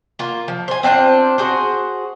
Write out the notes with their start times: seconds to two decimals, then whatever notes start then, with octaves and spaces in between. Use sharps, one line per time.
0.19 A#3 F4
0.48 F3
0.68 C5 G#5
0.83 C4 D4 F4 C5
1.38 F#4 G#4 C5